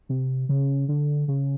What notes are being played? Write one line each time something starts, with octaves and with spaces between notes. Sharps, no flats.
C3
C#3
D3
C#3